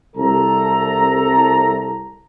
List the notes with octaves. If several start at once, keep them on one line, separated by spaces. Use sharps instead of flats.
C2 A4 A#5